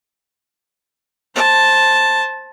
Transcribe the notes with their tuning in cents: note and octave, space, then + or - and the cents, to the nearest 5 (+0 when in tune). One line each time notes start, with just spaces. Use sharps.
C5 +15 A5 +0